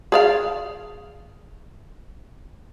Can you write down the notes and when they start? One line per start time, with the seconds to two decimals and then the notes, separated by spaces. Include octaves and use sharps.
0.12 G#4 D5 F5